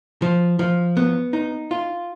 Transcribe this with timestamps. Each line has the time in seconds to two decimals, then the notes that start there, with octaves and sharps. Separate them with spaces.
0.22 F3
0.59 F3
0.97 B3
1.33 D#4
1.71 F4